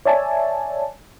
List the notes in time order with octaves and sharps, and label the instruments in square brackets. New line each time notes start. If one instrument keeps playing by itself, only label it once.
[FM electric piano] C#5 D5 E5 G#5 A5